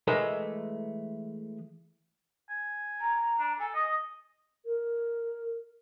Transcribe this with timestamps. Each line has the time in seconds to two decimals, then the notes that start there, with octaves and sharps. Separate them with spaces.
0.07 E3 G#3 A3 A#4 D#5 E5
2.49 G#5
3.01 A#5
3.39 D4
3.60 A4 G#5
3.74 D#5 D#6
4.66 A#4